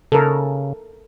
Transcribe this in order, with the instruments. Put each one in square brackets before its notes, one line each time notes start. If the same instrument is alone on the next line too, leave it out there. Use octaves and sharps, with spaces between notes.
[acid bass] C#3 [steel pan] A4 A#4